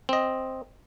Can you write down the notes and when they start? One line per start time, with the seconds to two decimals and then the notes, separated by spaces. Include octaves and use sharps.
0.09 C4 D#5